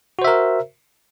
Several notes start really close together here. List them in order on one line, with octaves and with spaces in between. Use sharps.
F#4 C5 E5 A#4